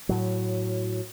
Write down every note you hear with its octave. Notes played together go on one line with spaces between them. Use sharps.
A2 F#3